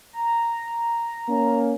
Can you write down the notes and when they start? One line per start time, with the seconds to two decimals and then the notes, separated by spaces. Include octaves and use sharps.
0.13 A#5
1.29 A#3 C#4